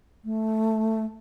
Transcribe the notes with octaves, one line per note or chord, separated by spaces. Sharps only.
A3